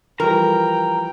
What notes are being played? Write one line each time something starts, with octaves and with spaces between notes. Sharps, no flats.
E3 F3 G3 A#4 G5 A#5